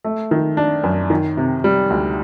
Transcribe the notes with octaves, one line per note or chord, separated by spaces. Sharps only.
A3
D#3
D4
F#2
D#3
C3
G3
D2